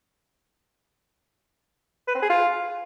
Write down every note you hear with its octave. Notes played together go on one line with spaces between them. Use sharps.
B4
C4
G#4
F4